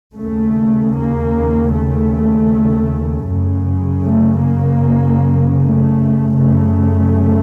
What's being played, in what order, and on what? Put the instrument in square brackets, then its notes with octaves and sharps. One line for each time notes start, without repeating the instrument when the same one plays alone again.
[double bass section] D#2 C#3 A3
A#3
A3
F#2 C#3
A3
A#3
A3
F#2 C#3 A3